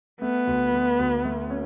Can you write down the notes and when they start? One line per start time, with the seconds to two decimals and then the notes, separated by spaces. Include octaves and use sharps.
0.21 A3 B3
0.47 D2
0.73 A3
0.99 D2
1.25 A3
1.50 C#4